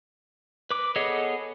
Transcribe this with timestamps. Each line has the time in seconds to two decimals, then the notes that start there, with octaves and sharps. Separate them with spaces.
0.70 B4 D6
0.96 B3 G#4 A4 C#5 D#5